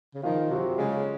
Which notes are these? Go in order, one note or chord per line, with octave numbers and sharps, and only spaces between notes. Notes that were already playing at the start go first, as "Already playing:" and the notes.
C#3
D#3 F3 F4
C3 F#3 F#4
C#3 G#3 G#4